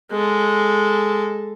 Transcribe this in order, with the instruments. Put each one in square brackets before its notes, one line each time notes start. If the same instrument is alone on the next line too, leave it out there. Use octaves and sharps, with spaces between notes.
[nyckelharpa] G#3 A4